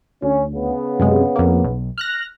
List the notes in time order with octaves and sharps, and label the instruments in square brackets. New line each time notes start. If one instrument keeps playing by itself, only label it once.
[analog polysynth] D2 [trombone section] C#4
[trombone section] C#3 B3
[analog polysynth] F#2 C3 G#3
F2 A#3
B1
F6 F#6 A#6